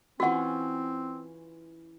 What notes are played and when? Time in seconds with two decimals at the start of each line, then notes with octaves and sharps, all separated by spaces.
0.20 E3 C4 C#4 F4 F#4 F#5